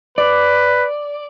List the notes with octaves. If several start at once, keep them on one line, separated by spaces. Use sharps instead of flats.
B4 D5